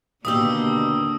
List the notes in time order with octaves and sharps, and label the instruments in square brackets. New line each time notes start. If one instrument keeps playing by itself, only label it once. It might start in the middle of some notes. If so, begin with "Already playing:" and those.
[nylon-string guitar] D#2 B2 G4 [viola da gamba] D3 A#3 D4 [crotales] D#6 E6